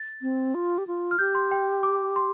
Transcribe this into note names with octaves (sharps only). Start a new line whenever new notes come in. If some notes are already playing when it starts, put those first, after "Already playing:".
Already playing: A6
C4
F4
G4
F4
F6
G4 G6
C6
G5
D6
C6